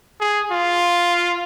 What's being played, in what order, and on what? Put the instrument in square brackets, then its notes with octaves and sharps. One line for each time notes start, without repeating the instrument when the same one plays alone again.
[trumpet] G#4
F4